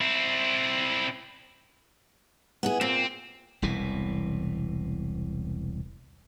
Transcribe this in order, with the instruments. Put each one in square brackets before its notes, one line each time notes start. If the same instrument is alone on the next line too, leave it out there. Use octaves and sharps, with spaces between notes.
[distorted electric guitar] C4 E4
[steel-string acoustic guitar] B3 E4 G#4
[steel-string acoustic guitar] A#2 [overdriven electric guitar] C4
[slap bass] E1 C2 B2 E3